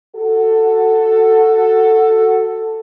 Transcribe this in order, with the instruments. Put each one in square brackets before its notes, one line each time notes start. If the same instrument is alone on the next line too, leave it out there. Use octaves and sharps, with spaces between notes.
[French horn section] F#4 A4